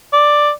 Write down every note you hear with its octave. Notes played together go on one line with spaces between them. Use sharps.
D5